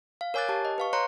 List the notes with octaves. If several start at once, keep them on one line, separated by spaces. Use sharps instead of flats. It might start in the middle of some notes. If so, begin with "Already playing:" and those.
F5
A#4 C#5 G#5 D6 F#6 A6
G4 A5
D#5
B4 F5 C#6
C#5 A#5 C6 F#6 C#7